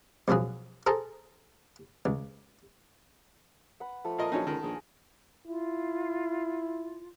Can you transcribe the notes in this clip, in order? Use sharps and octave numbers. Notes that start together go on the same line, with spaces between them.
B1 F#2 F3 F#3 G#4
G#4 A4 C5 A5 A#5
C#2
B4 F#5
F3 A3
A#2 A#4 D#5
A#1 F#3 C#4 D#4
C#2 D#3
A#1 G#4
E4 F4